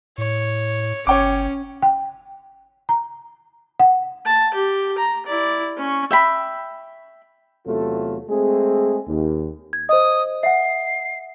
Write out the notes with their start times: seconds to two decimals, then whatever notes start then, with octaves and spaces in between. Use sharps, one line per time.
0.18 A2 C#5
1.07 G1 C#4 C#5 G5 D6
1.82 G5
2.89 A#5
3.80 F#5
4.26 A5
4.54 G4
4.98 A#5
5.26 E4 D5
5.77 C#4 C#6
6.11 E5 G5 B5
7.66 E2 C3 F#3 A3 F4 A4
8.30 G#3 A3 C4 G#4
9.08 D#2
9.73 G#6
9.89 C5 D#5 D#6
10.43 E5 F#5 C7